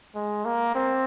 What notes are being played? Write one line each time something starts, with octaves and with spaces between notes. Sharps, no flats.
G#3
A#3
C4